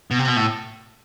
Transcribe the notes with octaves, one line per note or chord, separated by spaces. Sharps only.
B2
C3
B2
A2